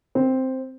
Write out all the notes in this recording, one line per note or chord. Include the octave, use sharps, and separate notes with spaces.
C4